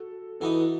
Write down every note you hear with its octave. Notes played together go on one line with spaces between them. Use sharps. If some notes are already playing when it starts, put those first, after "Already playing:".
Already playing: F#4 A4
E3 B3 D#4 F#4 A4